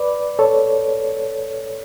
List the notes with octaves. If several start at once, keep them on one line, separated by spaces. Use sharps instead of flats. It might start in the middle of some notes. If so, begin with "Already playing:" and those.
Already playing: B4 D5
A4 C#5